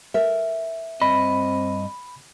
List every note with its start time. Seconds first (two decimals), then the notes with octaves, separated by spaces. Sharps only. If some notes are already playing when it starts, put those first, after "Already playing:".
0.14 A#4 E5
1.02 G2 C4 D#5 B5